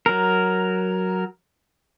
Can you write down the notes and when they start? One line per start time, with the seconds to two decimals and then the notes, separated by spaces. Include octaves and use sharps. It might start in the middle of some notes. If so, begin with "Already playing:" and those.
0.06 F#3 A#4